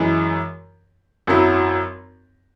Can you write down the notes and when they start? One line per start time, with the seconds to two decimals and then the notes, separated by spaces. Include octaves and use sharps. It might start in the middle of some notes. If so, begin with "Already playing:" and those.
Already playing: F#2 E3 G#3 E4
1.27 G#1 F#2 F#3 E4